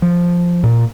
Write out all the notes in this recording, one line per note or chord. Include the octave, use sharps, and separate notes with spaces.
F3
A#2